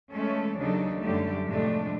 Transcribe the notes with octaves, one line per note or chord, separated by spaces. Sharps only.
E3 G#3 A3 C#4 A4 C#5
D#2 C#3 F#3 D4 D#4 A4
F#2 D3 F#3 G3 A3 G4
F2 A2 C3 G#3 A3 D4